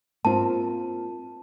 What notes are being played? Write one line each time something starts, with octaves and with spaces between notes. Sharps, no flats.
A#3 C4 F4 A5